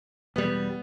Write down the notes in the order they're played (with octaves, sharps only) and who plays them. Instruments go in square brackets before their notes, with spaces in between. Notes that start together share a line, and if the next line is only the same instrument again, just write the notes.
[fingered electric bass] E1 G3 [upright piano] B3